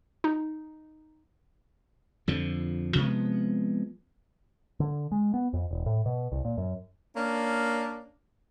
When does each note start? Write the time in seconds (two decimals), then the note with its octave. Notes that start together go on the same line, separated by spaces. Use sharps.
0.24 D#4
2.28 F2 D3 F3
2.95 C3 F3 G#3 B3
4.80 D3
5.12 G#3
5.34 B3
5.53 F2
5.71 E1
5.86 A2
6.06 B2
6.32 C2
6.45 A#2
6.57 F#2
7.16 A#3 C#4 D4